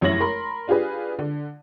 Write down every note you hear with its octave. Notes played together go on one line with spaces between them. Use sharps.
F1 F#2 E4 C#5 A#6 F#7
A#4 B5 C6
D4 F4 G4 G#4 B4
D3